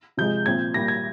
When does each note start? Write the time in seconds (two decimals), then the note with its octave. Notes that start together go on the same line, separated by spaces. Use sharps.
0.17 C3 F3 G#3 G6
0.46 A#2 F3 C4 G#6
0.74 A#2 G3 A#3 A#6
0.88 G#6